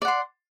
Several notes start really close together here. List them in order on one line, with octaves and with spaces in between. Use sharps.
D5 F#5 C6